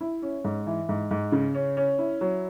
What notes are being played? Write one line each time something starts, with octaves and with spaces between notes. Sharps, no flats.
E4
C#4
G#2
E3
G#2
G#2
C#3
C#4
C#4
E4
F#3